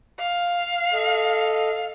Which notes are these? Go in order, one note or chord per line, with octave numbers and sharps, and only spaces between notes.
F5
A4 D#5